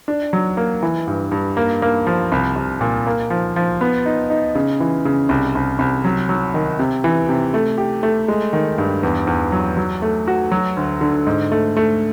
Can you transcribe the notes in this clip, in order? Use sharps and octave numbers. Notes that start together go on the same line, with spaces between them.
D4
F#3
A#3
E3
G2
G2
A#3
A#3
F3
C2
C2
A#2
A#3
F3
F3
B3
D#4
D#4
C#3
E3
C#3
C2
C2
C2
F#3
F#3
D#3
C3
E3
C3
A3
G4
A3
G#3
D#3
G2
E2
E2
F#3
F#3
A3
F#4
F#3
D2
D3
G#2
A3
A3